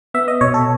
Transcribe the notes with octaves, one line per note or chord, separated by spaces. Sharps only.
B3 E5
D#5
B2 C#5
A4